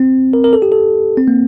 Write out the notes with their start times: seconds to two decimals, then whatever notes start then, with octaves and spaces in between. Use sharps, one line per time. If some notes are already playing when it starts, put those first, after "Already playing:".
Already playing: C4
0.33 A#4
0.44 A#4
0.53 A4
0.62 G4
0.72 A4
1.17 C4
1.28 A#3